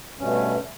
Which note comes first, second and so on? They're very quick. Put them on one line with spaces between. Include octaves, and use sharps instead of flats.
G2 C#4 B2 A3